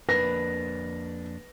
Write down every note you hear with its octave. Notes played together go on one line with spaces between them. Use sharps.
F2 A#3 D4 B4 A#6